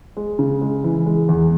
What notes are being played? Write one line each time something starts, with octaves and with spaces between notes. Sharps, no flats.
G#3
C#3
G#3
E3
G#3
E2